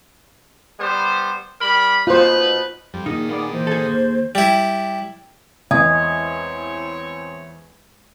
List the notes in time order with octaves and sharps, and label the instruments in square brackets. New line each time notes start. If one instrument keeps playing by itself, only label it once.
[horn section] G3 B3 C5
G3 A#4 B5
[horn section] B2 D#4 B4 [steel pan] F4 C5
[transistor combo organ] F2 G3
[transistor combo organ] A#2 D#3 [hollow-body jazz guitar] D#4 [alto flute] G#4
[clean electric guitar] A#3 B3 D5
[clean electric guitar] E3 [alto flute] C5
[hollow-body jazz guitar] G#4 A4
[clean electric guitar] D#2
[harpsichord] G3 E4
[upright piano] E2 [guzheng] G#3 [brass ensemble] C4 E4 C#5 [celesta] D#6 G#6